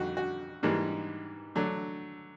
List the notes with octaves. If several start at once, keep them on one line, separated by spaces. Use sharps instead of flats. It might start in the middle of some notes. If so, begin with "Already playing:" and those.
Already playing: F2 D3 G3 D#4 F#4 G4
F#4
G#2 E3 G3 A#3 D4
D3 F#3 A3 D4